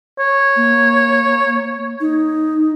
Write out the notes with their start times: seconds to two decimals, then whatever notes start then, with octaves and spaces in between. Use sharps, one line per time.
0.19 C#5
0.56 A#3
2.00 D#4